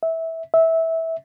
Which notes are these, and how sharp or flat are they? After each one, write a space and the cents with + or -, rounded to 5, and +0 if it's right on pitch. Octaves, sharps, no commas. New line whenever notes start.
E5 -15
E5 -15